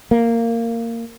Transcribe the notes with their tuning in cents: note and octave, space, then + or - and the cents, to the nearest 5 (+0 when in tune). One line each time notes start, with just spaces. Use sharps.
A#3 -15